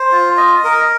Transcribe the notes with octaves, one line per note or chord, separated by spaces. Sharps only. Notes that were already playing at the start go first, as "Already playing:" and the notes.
Already playing: C5
F4
D#5
A#4